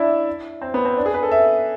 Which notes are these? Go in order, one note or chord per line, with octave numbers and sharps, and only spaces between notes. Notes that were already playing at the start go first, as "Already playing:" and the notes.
Already playing: D4 E4 E5
C4
B3
C4
D4
G#4
B4
A4
E5